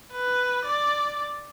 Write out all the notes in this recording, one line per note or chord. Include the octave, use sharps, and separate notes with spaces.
B4
D5